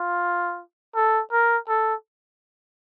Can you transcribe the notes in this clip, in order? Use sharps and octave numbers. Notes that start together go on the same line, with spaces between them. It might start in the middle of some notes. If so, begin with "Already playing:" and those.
Already playing: F4
A4
A#4
A4